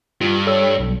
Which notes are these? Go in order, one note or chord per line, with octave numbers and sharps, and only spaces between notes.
G2 F4
A4 C#5 E6
B1